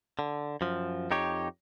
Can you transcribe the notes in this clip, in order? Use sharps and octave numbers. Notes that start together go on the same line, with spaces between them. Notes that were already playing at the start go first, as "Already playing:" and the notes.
D3
F#2 F3
F2 D#4 G4 C#5